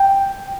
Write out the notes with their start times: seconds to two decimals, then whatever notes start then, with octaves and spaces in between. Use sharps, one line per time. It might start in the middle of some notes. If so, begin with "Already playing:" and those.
Already playing: G5